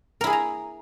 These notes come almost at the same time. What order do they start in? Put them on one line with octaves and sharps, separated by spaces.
A#4 E4 G#4 G#5 A#5